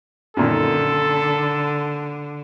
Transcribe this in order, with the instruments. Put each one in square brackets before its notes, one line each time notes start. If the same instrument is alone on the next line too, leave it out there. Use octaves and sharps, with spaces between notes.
[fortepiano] F#2 A#2 D#3 [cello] D3 [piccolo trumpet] A4